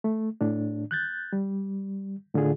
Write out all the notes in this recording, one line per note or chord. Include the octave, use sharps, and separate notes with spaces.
A3
A2 D4
F#6 G6 A6
G3
A2 D3 F4 G#4